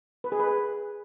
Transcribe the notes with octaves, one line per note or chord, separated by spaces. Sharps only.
B4
G#4
B4